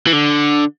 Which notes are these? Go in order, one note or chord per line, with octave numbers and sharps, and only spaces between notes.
E3
D3